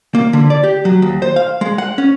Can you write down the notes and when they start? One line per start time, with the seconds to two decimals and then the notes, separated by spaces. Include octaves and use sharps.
0.15 A#3
0.33 D3
0.50 D5
0.64 G4
0.85 F#3
1.02 D#2
1.22 C5
1.36 F5
1.61 G#3
1.78 F#5
1.98 C#4